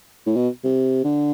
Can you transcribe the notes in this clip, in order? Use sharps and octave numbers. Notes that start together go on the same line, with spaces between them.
A2
B2
C3
D3